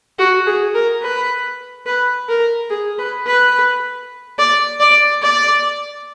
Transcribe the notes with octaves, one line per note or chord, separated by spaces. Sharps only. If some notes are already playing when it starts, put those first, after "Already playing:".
F#4
G#4
A#4
B4
B4
A#4
G#4
B4
B4
D5
D5
D5